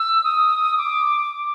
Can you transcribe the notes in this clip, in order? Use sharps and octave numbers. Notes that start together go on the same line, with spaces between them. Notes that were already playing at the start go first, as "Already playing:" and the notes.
Already playing: E6
D#6
D6